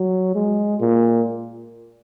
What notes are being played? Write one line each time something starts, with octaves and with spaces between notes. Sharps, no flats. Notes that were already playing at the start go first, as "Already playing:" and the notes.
Already playing: F#3
G#3
A#2